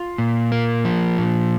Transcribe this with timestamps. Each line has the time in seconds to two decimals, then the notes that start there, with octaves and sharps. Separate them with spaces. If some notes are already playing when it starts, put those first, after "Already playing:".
Already playing: F4
0.18 A#2
0.52 A#3
0.85 F3
1.18 A#2